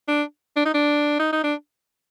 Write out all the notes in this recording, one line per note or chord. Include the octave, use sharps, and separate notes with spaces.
D4
D4
D#4
D4
D#4
D#4
D4